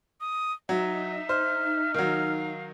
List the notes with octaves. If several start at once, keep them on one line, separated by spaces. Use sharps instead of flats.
D#6
F#3 D#4 E5
C5 F6
D#3 F#3 F5